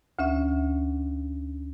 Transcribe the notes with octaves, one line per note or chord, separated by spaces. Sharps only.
D2 C#4 E5